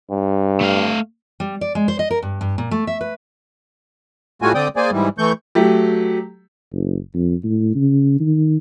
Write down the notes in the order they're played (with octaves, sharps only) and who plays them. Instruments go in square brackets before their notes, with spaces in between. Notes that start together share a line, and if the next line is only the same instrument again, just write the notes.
[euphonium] G2
[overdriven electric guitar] A3 F5
[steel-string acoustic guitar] G3
D5
G#3
C5
D#5
A#4
G2
G2
A#2
A3
E5
B4
[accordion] A2 G3 A3 F4 F#4 G#5
D3 C4 D5 G5 D#6
A#3 G#4 C5 D5 G#5
G#2 E3 G3
E3 A3 C#6 G6
[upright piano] F#3 A3 G4
[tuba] F#1
F2
A2
C#3
D#3